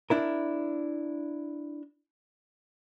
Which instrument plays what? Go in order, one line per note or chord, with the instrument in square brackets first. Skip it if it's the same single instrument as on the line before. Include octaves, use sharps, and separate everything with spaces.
[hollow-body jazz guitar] D4 E4 A#4